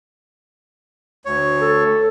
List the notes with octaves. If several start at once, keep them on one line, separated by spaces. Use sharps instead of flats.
D2 C#5
A4